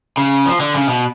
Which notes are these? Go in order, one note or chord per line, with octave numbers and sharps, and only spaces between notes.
C#3
F3
D3
C#3
B2